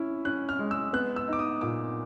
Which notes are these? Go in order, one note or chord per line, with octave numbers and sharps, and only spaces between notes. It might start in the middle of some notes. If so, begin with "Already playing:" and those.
Already playing: C#4 E4
C#4 F#6
F6
G#3
E6
B3 F#6
E6
D#4 D6
D#6
A#2 D6